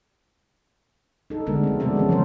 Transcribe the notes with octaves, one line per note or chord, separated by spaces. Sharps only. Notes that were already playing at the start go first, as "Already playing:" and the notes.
D#4 A4
D3 G#3 A3 B3 D4 A#4
F#3 C4
C#3 F#3 G#3 B3 D4 A4
E3 F3 C#4
D3 E3 G#3 A3 A#4 C5